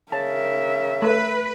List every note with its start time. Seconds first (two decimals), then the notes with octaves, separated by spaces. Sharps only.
0.12 C#3 A#4 E5 A5
1.02 A3 B4